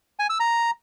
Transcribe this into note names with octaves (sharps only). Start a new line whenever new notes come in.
G#5
E6
A#5